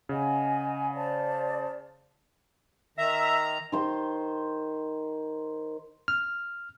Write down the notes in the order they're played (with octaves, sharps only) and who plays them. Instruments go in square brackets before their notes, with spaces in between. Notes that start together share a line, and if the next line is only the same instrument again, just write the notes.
[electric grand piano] C#3 [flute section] D#5 F#5 G#5
[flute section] C5 D5 A5
[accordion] D#3 A#5 [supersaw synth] E5
[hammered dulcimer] D#3 C5 C6
[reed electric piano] F6